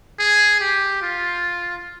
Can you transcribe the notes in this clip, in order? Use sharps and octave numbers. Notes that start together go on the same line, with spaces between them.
G#4
G4
F4